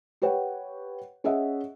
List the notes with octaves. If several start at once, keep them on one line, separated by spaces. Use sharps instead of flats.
G4 B4 C#5 F#5 G5
C#4 G#4 D#5 E5 F#5